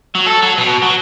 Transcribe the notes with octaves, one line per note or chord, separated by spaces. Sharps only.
F#3
A4
F#3
B2
F#3